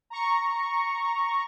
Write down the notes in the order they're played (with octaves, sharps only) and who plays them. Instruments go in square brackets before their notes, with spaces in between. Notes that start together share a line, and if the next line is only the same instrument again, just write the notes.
[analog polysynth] A#5 C#6